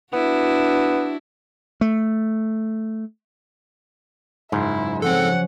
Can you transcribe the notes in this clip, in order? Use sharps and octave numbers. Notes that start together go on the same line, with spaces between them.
B3 D4 E4 F#4
A3
F#1 G#2 E4 F4
F3 F#3 C4 C#4 A4 F#5